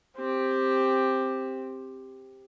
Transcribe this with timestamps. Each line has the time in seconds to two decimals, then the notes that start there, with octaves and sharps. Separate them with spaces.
0.17 C4 G4